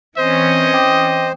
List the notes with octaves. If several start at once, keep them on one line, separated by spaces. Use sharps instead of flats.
E3 C4 C#4 C5 D#5
G5 D6 D#6